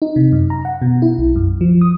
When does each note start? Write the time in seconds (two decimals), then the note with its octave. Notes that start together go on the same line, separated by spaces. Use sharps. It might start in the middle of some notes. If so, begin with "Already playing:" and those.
0.02 D#4
0.16 C3
0.32 F#2
0.50 A#5
0.65 F#5
0.82 B2
1.02 E4
1.18 B1
1.35 F#2
1.61 F3
1.81 D#6